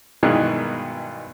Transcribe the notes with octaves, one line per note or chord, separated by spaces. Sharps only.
G2 B2 D#3 E3 F#3 G#3